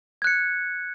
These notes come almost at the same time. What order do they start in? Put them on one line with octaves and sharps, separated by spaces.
G#6 F#6 C#7